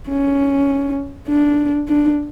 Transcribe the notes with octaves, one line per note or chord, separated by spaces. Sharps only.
C#4
D4
D4